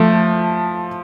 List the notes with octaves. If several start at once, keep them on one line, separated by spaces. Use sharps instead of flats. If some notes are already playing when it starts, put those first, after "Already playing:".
Already playing: F3 A3